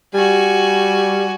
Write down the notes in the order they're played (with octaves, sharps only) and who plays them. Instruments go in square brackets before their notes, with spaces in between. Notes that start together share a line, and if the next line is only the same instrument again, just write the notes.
[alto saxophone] G3 [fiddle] F#4 G#5